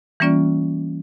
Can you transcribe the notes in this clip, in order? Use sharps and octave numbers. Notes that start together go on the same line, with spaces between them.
E3 G3 A#3 C#4 F4 D5